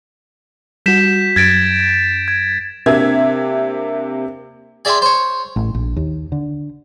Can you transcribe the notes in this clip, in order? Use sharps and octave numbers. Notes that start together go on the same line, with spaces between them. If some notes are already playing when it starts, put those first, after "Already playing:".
G3 F#4 G6 B6 E7
F#2 G#6 A6 D7
G#6
C3 A#3 C4 D4 E5 G#6
G#4 D5 E5 G5 G#5 C6
C5 C#5
A1
A#1
D#2
D3